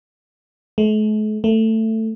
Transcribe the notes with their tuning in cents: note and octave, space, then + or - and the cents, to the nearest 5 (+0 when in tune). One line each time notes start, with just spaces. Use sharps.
A3 -45
A3 +15